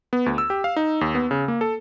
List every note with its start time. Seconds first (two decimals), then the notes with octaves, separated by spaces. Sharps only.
0.13 B3
0.26 D2
0.38 E6
0.50 G4
0.64 F5
0.76 D#4
1.01 D#2
1.15 B3
1.31 C#3
1.48 A#3
1.61 A4